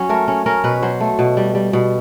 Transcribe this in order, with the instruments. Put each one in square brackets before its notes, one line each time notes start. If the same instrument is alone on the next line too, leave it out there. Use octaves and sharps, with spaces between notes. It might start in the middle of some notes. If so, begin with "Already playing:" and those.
Already playing: [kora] F#3 C#4
A3 A#4
C#4
C#4 A#4
B2 B4
F#3 C5
A3
B2
G3
G3
B2